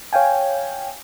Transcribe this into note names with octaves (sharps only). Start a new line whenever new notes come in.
C#5 F5 G5 G#5